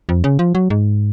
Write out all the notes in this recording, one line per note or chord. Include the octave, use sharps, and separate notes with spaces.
F2
C#3
F3
F#3
G#2